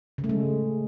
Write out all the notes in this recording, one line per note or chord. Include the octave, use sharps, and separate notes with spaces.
C#3
A3
G#3